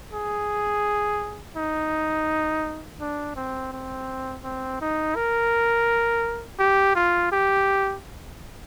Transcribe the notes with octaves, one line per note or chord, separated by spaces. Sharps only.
G#4
D#4
D4
C4
C4
C4
D#4
A#4
G4
F4
G4